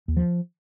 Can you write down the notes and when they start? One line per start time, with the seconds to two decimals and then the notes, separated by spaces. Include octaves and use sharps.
0.08 D#2
0.17 F3